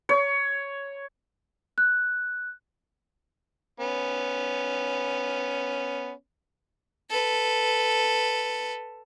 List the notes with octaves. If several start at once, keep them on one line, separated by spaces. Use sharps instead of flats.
C#5
F#6
B3 C#4
A4 B4